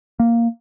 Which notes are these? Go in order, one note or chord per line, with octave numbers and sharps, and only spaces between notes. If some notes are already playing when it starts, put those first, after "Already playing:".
A#3